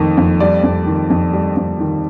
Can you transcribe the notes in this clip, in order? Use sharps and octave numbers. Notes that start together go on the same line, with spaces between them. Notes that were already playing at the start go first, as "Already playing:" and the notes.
Already playing: F2 D#3 A3
F2
G3 D5
F2
D#3
F2
G3
F2
D#3